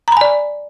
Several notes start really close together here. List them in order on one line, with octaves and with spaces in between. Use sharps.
A#5 B5 G#5 D5